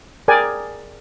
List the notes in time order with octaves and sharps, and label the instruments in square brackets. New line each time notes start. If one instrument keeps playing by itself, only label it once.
[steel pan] G#4 A#4 D5 G5 G#5